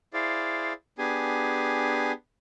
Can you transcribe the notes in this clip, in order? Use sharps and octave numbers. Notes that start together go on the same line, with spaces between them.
E4 G#4 C5 D5 F5
B3 D4 G4 G#4 G#5